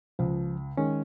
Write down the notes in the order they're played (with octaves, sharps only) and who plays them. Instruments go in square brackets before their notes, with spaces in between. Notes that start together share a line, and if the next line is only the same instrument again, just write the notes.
[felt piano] C#2 [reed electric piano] F3
[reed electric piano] D#3 G#3 C#4